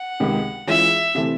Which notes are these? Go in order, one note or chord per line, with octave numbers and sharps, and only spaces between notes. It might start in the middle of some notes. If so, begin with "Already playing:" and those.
Already playing: F#5
C#2 C3 D#3 G#3
E3 G#3 C#4 F4 E5
C3 E3 A3 C4